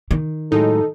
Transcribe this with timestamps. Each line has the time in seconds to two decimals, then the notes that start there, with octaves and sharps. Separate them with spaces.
0.11 D#3
0.52 A2 F#3 G#3 D#4 A4